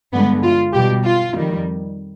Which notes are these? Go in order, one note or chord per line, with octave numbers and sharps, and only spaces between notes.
G2 D3 G#3 B3
F4
B2 G3 G4
F4
F2 D#3 G3